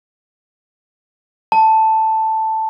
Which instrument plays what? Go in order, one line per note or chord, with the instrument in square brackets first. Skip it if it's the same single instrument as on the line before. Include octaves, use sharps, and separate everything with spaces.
[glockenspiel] A5